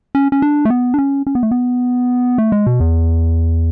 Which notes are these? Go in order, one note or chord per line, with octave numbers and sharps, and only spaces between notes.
C#4
C#4
D4
A3
B3
D4
C#4
C#4
B3
A3
B3
A3
G#3
B2
E2